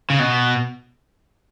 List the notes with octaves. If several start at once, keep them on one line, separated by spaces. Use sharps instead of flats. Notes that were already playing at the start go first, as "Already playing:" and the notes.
C#3
B2